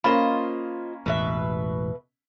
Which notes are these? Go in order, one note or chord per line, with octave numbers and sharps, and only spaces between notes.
A#3 C#4 F4 C5 D#5 B5
E1 A1 B2 B4 E5